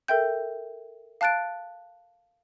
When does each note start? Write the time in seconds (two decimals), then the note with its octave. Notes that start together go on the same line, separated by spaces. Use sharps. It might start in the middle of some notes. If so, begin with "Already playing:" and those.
0.08 A4 A#4 E5 G5 G6
1.21 F5 A5 F#6 A6 D7